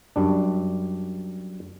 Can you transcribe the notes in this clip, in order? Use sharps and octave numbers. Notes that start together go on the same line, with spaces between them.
F#2 G3 D4